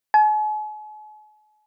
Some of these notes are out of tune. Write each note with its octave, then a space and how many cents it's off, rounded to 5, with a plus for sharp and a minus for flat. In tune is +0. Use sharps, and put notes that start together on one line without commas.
G#5 +45